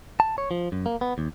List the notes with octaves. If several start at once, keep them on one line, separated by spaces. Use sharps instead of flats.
A5
C#5
F3
F#2
A#3
B3
D#2